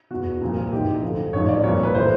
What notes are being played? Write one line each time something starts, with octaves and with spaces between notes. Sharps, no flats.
E2 B2 F#4
C2 A#2 F3
G#1 G#2 E3 G4
D2 D3 F3
A1 G#2 F3 C#5
D5
C2 A#2 F3 C#5
B4
A2 E3 C5